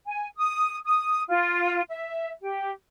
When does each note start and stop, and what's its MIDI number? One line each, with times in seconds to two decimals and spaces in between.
0.06 0.27 80
0.37 0.77 87
0.84 1.23 87
1.28 1.81 65
1.89 2.29 76
2.41 2.70 67